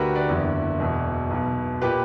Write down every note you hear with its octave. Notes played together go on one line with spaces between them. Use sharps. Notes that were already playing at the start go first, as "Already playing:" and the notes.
Already playing: D2 D3 F#4 G4 A#4 B4
B4 D5
F#1 E2 D3
E1 E2 B2
B1 B2
A#2 G4 B4